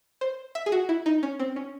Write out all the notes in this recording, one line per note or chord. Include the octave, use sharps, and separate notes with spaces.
C5
E5
G#4
F#4
E4
D#4
C#4
C4
C#4